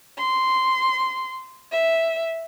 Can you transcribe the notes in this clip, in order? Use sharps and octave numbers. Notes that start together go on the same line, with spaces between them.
C6
E5